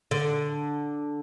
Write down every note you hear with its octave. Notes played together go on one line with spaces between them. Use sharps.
D3